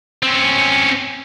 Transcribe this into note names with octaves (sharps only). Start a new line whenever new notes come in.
C4 C#4